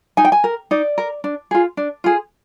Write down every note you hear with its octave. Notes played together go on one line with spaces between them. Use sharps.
D#4 G#5
G5
G#5
A#4
D#4 D5
A#4
D4
F4 G#4
D4
F4 G#4